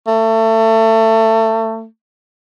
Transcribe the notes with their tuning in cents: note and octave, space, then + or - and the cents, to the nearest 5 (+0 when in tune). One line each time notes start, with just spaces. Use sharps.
A3 +25